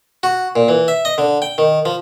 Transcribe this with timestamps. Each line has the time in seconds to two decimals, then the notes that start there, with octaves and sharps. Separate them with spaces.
0.23 F#4
0.56 A#2
0.68 E3
0.88 E5
1.05 D#5
1.18 D3
1.42 G5
1.58 D#3
1.85 F3